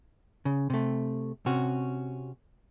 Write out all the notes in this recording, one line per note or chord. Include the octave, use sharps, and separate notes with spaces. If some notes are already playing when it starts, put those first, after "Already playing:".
C#3
C3 A3
C3 C#4 F#4